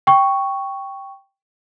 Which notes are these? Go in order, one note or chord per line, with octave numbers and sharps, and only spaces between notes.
G5 C#6